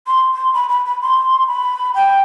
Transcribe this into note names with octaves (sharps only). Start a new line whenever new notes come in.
C6
C6
B5
B5
B5
C6
B5
G5